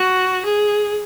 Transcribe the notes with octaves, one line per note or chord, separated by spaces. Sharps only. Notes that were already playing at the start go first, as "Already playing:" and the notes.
Already playing: F#4
G#4